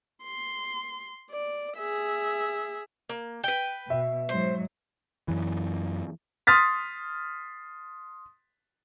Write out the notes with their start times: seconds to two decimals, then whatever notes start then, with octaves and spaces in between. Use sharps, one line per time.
0.24 C6
1.31 D5
1.77 G#4 E5
3.09 A#3
3.44 B4 G5
3.90 B2 E5
4.29 G#2 F#3 C5
5.28 F#2 E3
6.47 C6 D#6 F6 A6 B6